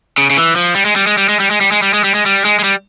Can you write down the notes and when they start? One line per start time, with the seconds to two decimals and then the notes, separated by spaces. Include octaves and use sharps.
0.18 C#3
0.30 C#3
0.37 E3
0.56 F3
0.75 G3
0.85 G#3
0.96 G3
1.07 G#3
1.18 G3
1.29 G#3
1.40 G3
1.51 G#3
1.61 G3
1.72 G#3
1.82 G3
1.94 G#3
2.04 G3
2.15 G#3
2.26 G3
2.45 G#3
2.59 G#3
2.64 G3